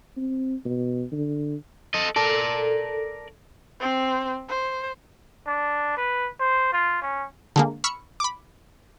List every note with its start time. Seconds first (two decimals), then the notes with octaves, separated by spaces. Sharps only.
0.17 C4
0.66 B2
1.12 D3
1.94 A4 D#5
2.16 A4 A#4 D5
3.80 C4 C5
4.49 C5
5.47 D4
5.98 B4
6.40 C5
6.73 F4
7.02 C#4
7.56 D3 G#3 A#3
7.84 B5 C#6 E6 F6 C#7
8.20 B5 D6